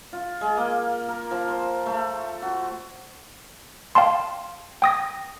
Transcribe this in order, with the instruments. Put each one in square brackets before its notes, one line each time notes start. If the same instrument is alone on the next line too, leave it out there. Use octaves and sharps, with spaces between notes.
[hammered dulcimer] F4
G#3
A#3
A#4
F3
C5
A3
F#4
[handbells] F5 G5 A5 C6
G5 D#6 A#6